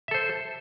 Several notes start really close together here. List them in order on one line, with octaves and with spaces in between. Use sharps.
E5 A4 C5